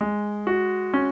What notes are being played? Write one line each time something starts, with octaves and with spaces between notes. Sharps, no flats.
G#3
F#4
C#4